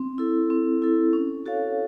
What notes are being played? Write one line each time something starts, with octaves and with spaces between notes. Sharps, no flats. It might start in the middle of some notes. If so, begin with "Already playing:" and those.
Already playing: C4
E4 A4
C4
E4 A4
C#4
F#4 A4 C#5 F5